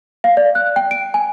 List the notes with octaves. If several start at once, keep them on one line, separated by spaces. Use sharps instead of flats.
F5
D5
F#6
G5
D7
G#5